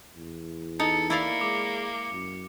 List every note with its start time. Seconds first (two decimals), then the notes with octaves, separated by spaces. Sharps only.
0.16 E2
0.80 D#4 A4 C#7
1.10 A#3 E4 D5 F5
1.41 G#3 D6
2.11 F#2